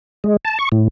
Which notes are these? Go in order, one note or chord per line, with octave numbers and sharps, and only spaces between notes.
G#3
A5
C#6
A2